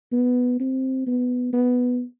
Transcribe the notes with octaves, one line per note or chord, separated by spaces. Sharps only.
B3
C4
B3
B3